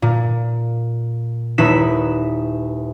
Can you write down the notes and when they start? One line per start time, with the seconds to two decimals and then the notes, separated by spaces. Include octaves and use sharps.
0.02 A#2
1.58 D#1 D#4 E4 B4 B6 E7